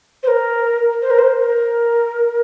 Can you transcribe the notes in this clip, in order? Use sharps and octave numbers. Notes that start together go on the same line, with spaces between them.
C5
A#4
C5
A#4
C5
A#4